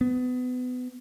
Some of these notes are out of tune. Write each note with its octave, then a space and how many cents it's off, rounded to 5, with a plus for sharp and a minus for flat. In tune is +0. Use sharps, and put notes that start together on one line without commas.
B3 +25